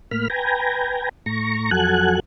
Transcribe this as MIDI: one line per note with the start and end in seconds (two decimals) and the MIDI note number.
0.11 0.28 45
0.11 0.28 58
0.11 0.28 83
0.11 0.28 89
0.30 1.09 71
0.30 1.09 79
0.30 1.09 80
0.30 1.09 82
1.26 1.70 45
1.26 1.70 82
1.26 1.70 85
1.71 2.20 41
1.71 2.20 54
1.71 2.20 69
1.71 2.20 78
1.71 2.20 80
1.71 2.20 90